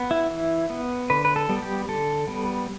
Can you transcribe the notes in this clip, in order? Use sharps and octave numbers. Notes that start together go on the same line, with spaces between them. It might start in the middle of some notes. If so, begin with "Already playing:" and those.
Already playing: B3
E4
E3
B3
D3 B4
B4
A4
G3 B3
G4
D3 A4
G3 B3